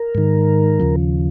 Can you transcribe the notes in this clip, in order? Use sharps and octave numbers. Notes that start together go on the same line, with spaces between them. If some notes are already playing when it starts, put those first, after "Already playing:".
Already playing: A#4
G#2 D#3
D#2 C#3 F3